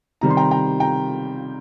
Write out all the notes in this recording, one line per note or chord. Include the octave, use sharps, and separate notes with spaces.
C3 D#3 G3 A#5
C6
G5 A#5
G5 A#5
G5 A#5